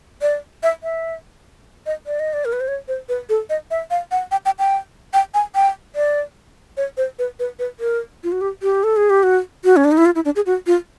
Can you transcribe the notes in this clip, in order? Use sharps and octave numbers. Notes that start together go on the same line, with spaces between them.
D5
E5
E5
D#5
D5
D#5
D5
A#4
B4
C5
C#5
C5
B4
A4
D#5
E5
F5
F#5
G5
G5
G5
G5
G#5
G5
D5
C#5
C5
B4
B4
B4
A#4
F4
F#4
G4
G4
A4
G#4
G4
F#4
F#4
C#4
D4
D#4
E4
F4
E4
D4
G#4
F#4
F4